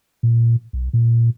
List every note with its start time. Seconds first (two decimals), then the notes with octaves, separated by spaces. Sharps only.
0.23 A#2
0.73 B1
0.93 A#2